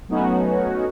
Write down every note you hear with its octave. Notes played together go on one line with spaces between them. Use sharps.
F#3 A3 B3 C#4 D#4 F#4